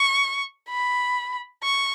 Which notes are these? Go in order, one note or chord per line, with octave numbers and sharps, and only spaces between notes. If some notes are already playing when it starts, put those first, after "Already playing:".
Already playing: C#6
B5
C#6